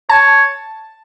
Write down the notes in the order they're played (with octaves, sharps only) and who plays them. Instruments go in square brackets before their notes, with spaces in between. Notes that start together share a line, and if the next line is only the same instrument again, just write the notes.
[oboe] C#5 [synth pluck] A5